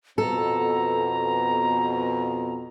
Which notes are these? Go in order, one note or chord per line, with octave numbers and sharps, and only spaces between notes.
F2 B2 B3 A4 A#5